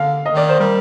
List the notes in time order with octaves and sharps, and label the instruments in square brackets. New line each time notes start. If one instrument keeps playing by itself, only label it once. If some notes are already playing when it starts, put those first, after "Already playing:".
Already playing: [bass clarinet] D3 [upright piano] F5
[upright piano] D#5
[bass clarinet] D#3
[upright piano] D5
C5
[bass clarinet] G3 [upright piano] A#4